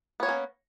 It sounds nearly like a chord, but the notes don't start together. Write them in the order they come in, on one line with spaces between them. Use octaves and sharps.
B3 C#5 A#3 C#4